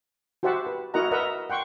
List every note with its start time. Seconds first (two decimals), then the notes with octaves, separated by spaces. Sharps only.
0.43 F#4 G4 C5 E5 F#5 A5
0.67 B4
0.94 E4 F#4 A#4 D#5 F#5 A#5
1.11 A#4 B4 D#5 E5 F#5 A#5
1.50 F#5 G5 C6 C#6